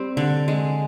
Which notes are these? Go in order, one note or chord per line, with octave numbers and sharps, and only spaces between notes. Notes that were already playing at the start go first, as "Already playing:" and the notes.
Already playing: G3 C4
D3
G#3